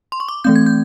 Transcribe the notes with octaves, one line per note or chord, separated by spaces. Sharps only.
C6
C#6
D6
E3 A3 C4 G6
G#6
G6